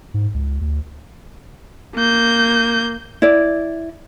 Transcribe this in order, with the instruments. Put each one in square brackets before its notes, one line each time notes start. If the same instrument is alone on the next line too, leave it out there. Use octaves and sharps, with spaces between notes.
[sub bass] G#2
C#2
D2
[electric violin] A#3 G6
[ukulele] E4 D5